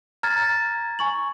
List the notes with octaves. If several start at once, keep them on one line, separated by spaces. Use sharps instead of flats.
A#5 F6 G#6 A6
G#5 C#6 F#7